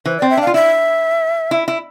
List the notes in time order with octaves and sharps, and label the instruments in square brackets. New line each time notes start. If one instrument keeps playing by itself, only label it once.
[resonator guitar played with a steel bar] E3 [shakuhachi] C5
[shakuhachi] D5
[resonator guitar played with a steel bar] C4
[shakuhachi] E5
[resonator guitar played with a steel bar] D4
[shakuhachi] F5
[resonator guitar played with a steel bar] F4
[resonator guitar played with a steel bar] E4 [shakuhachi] E5
[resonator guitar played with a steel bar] E4
E4